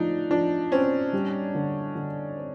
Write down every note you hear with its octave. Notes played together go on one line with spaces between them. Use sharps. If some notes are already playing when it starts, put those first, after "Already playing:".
Already playing: F3 A3 D4 D#4
F3 D4
C4 C#4
G3
D3
D3
C4